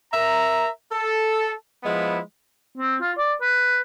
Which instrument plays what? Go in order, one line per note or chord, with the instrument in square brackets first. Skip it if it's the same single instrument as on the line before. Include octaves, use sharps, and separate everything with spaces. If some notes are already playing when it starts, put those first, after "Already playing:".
[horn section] A#4 E5 A#5
A4
F3 G#3 B3 E4
[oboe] C4
F4
D5
B4